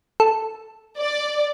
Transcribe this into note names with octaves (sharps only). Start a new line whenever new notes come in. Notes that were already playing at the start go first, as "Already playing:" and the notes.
A4
D5